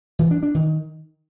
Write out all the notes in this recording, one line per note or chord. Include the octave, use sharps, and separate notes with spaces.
E3
D4
D4
D#3